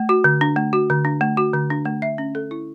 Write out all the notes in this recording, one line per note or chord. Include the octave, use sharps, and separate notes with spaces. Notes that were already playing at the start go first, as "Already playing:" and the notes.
Already playing: A3
F#4
D3
D4
A3
F#4
D3
D4
A3
F#4
D3
D4
A3
E5
C#4
A4
E4